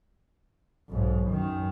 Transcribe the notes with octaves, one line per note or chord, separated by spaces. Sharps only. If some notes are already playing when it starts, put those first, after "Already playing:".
B1 G#2
F#2 D#3